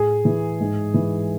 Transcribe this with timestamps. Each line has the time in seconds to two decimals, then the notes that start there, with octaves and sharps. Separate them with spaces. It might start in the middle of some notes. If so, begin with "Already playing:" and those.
Already playing: A2 G#4
0.25 E3
0.60 G#2
0.94 E3